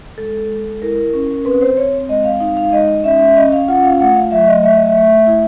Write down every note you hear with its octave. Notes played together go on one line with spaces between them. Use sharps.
G#3 A4
G#3
E4 A#4
C#4
C4 B4
C5
C4 C#5
G#3 D#5
F5
D#4 F5
F5
G#3 D#5
C#4 E5
C#4 D#5
F5
F4 F#5
F5
A3 F#5
F5
F#3 E5
D#5
A3 E5
D#5
E5
A3
E4